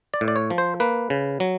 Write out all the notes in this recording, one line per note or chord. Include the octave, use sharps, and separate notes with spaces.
D5
A2
D5
C#5
F3
C5
A#3 B4
C#3
F#3